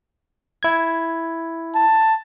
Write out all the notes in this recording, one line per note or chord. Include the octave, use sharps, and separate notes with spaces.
E4 G#6
A5